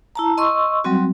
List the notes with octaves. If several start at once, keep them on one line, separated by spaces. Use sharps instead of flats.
E4 A5 A#5
D#5 C6 C#6 E6
F#3 G3 C4 F#4